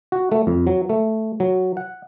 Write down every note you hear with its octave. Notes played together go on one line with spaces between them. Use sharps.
F#4
A3
F2
F#3
A3
F#3
F#5